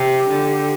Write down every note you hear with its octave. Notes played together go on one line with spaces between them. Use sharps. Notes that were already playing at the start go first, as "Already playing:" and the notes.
Already playing: C3 G4
D3